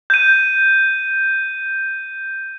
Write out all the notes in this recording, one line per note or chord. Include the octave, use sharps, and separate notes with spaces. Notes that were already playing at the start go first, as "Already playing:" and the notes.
G6 D#7